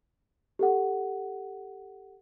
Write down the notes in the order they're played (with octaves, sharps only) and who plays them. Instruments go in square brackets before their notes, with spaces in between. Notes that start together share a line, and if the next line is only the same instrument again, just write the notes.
[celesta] G4 A4 F#5